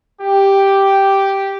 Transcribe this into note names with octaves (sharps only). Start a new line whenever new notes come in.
G4